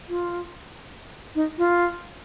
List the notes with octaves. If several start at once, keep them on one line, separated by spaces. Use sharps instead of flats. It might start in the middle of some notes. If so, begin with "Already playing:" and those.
F4
D#4
F4